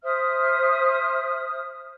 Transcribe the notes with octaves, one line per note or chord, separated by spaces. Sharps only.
C5 E5 D#6 F6